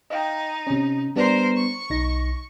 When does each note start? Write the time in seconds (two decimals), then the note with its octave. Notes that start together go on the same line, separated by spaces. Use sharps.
0.10 D#4 D#5 F5 G5
0.67 C3 C#4
1.16 G3 B3 D4 A#4 C5
1.56 C#6
1.90 B1 D#4 A#6